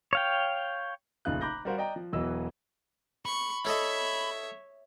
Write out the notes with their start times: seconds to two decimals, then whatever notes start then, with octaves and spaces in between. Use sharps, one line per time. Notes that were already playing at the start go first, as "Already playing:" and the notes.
0.13 C#5 F5 G5
1.25 F1 A#1 C#3 D#4 F4 F#6
1.41 A#5 B5 D6 F#6 G6 A#6
1.65 G3 F#4 A#4 C5 F5 F#5
1.78 D5 D#5 G5 A#5
1.96 F3
2.13 E1 E2 E3 F#3 D#5 E6
3.25 B5 C#6
3.65 E4 A4 C#5 D#5 E5